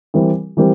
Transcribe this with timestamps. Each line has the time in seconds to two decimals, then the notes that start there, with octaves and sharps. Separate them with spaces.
0.14 E3 G3 C4 G4 A#4
0.57 E3 G3 C4 G4 A#4